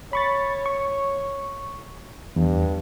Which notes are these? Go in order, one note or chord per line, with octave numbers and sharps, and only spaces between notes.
C#5 B5 C#6 A6
C#6
E2 G2